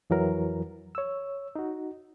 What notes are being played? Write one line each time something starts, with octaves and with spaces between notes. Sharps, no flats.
F2 E3 F#3 A#4
C#5 E6
D#4 F#4